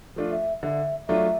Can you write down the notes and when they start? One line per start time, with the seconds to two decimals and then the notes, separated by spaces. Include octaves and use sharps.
0.16 F3 A3 D4 F4
0.31 E5
0.63 D3 E5
1.08 F#3 A3 D4 F4 E5